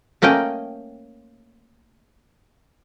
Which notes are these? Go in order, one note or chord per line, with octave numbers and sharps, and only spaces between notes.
A3 A#3 C#4 D#5 G5